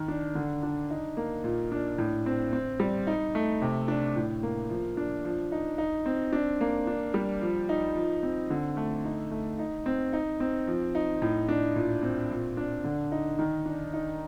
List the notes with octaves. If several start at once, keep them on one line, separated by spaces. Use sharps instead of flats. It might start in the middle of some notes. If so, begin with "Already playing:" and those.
Already playing: D#3
D4
D3
D4
D#4
A#3
A#2
D4
A2
C4
C4
G3
D#4
A3
C3
D4
A2
A#3
F3
D4
F3
D#4
D#4
C4
D4
A#3
D4
G3
F3
D#4
F3
C4
D3
A3
D#4
A3
D#4
C4
D#4
C4
F3
D#4
A2
D4
A#2
C4
A#2
D4
D3
D#4
D#3
D4
D#4